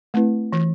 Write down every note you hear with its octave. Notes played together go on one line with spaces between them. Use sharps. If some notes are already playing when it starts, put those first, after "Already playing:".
A3 C4 E4 B4
E3